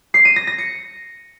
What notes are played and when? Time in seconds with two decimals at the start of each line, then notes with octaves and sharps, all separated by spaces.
0.14 C7
0.25 D#7
0.36 A#6
0.47 A#6
0.58 C#7